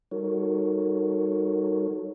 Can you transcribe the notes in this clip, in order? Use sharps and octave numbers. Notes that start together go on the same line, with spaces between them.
G3 D#4 F#4 A4 A#4 C#5